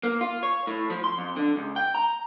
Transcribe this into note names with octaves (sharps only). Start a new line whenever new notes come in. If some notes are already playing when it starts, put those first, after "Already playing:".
A#3
F4
C#5
A2
F3
C6
F2
D3
C#2
G5
A#5